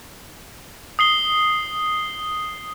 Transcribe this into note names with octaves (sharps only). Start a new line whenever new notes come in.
D#6 C7 G7